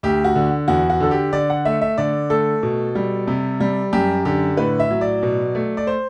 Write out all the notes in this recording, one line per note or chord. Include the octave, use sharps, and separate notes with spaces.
D2 G4
F#4
D3
E2 F#4
F#4
D3 A4
G4
D3 D5
F#5
A3 E5
E5
D3 D5
A3 A4
B2
G3
C3
G3
F#2 G4
D3 G4
A2 B4
E5
F#3
D5
B2
A3
D5
C5